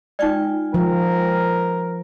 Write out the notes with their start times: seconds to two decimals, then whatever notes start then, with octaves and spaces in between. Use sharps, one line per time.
0.19 G#3 D#4 F4 D5 G5
0.74 F3 A#4